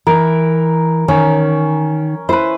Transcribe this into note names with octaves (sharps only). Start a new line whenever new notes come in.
E3 A#4
D#3 C#4
E4 B4 C5